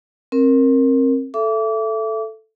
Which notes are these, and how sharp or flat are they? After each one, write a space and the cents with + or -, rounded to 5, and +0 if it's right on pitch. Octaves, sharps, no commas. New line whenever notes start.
C4 +30 A#4 +0
A4 +0 E5 +25 D6 -30